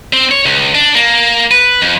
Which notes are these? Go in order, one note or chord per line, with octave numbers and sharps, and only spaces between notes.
C4
C#5
C#2
D4
A#3
B4
F2